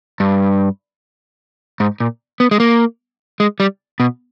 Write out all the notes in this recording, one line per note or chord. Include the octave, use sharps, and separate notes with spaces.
G2
G#2
A#2
B3
G#3
A#3
G#3
G3
B2